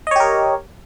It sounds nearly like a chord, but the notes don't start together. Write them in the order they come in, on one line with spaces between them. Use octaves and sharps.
D#5 C#5 G4 A#4